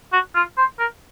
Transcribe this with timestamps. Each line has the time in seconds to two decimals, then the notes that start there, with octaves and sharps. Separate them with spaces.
0.13 F#4
0.35 F4
0.58 C5
0.79 A#4